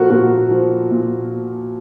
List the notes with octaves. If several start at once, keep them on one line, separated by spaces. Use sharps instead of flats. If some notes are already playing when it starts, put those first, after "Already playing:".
Already playing: A#2 F3 F#4 A4 A#4
A#2 F#4 A#4
F3
A#2